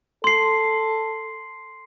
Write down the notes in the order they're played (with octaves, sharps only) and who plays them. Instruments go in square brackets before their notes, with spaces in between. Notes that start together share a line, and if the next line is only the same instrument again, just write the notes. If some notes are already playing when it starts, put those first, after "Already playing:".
[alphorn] A4 [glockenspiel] C6 C7